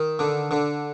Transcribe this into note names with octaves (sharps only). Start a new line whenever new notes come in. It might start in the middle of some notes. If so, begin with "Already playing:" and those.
Already playing: D#3
D3
D3